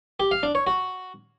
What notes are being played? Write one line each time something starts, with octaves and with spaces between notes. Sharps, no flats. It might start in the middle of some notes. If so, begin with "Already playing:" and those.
G4
F5
D4
C#5
F#4